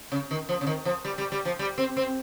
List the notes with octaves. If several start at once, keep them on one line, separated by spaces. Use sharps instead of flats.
C#3
D#3
F3
C#3
D#3
F3
G3
G3
G3
F3
G3
C4
C4